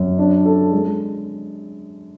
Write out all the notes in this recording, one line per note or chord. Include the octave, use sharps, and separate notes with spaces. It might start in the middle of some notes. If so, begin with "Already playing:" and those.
Already playing: F#2
D4
A4
G#3